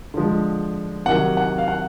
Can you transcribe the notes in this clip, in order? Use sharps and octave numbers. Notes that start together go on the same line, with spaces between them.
D3 F3 G#3
C3 D#3 F#3 F#5
F#5
F5
F#5